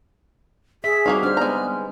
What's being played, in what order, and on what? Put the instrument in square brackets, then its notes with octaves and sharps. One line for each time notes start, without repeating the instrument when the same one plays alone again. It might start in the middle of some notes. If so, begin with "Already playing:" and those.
[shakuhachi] G#4 [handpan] E5 [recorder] B6
[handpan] G3 C4 D#4 [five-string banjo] A#3 F#4 F5
[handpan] D4 C5 [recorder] F6
[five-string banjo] G#3 A#5 [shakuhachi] B3